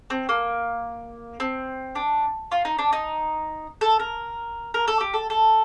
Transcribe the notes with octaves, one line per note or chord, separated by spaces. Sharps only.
C4
A#3
C4
D4
F4
D#4
D4
D#4
A4
A#4
A#4
A4
G4
A4
A4